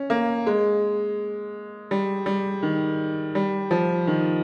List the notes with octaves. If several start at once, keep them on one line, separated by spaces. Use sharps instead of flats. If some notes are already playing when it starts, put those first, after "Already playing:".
Already playing: C#4
A#3
G#3
G3
G3
D#3
G3
F3
D#3